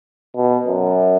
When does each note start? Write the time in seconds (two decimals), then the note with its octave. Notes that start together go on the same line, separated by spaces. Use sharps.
0.36 B2
0.66 F#2